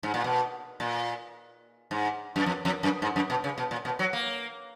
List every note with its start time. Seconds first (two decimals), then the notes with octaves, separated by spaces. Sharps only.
0.03 G#2
0.14 A#2
0.24 B2
0.80 A#2
1.91 G#2
2.36 F#2
2.46 F2
2.65 F2
2.83 F#2
3.02 G#2
3.16 F#2
3.30 B2
3.44 C#3
3.58 B2
3.71 A#2
3.85 B2
3.99 F#3
4.13 A#3